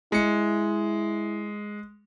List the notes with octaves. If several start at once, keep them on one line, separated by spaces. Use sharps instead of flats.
G#3 E4 C#7